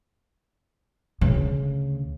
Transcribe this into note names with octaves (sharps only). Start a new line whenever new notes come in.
D2 C#3